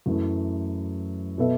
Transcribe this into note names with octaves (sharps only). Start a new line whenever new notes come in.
F#2 E3 A3
B2 B3 A4 E5